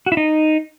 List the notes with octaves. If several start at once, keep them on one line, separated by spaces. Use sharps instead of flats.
F#4
E4
D#4